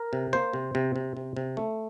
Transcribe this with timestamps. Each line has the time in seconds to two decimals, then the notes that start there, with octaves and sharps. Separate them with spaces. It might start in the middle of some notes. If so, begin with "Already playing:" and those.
Already playing: A#4
0.13 C3
0.33 A#3 C5
0.53 C3
0.75 C3
0.96 C3
1.17 C3
1.37 C3
1.57 A3